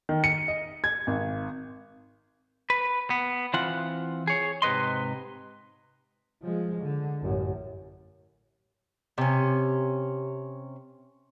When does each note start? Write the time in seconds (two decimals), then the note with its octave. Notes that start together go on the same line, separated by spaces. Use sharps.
0.09 D#3
0.24 C#7
0.48 D#5
0.84 G#6
1.07 G#1
2.70 B4
3.10 B3
3.54 E3 C4 F4 F#5
4.27 G#4 C#5
4.62 G#2 C3 B4 D#5 C6
6.42 F3 G#3
6.83 D3
7.21 A1 F#2
9.18 C3 C#4